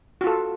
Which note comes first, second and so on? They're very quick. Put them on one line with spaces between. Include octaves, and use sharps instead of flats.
F#4 F4 A4